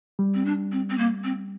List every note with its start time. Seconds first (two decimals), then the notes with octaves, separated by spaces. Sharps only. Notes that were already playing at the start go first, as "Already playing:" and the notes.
0.19 G3
0.34 C4
0.45 D4
0.72 C4
0.90 C4
0.98 A#3
1.24 C4